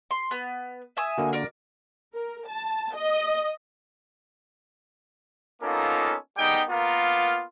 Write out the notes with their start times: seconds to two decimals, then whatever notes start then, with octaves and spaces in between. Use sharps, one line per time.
0.11 C6
0.31 B3
0.97 E5 G#5 D#6
1.18 D3 A#3 F#4
1.33 A#4 D5
2.14 A#4
2.48 A5
2.95 D#5
5.63 A#3 B3 C#4 D#4 F4 A4
6.37 G3 G#3 B3 D#4 G5
6.69 A#3 B3 F4 A#4 F5